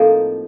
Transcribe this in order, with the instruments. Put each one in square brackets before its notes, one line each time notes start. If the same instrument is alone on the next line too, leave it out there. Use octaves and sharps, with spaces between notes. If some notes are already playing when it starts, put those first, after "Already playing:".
Already playing: [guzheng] A2 F3 A#3 C4 D#4 F4